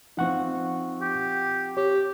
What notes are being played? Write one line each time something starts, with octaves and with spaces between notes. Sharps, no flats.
F3 C4 D#4 F#5 C#6
G4
G4 C#5